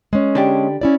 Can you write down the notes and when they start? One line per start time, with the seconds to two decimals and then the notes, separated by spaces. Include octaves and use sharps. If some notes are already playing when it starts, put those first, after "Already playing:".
0.13 G#3 C#4
0.35 D3 D4 G4
0.81 C#4 E4 D5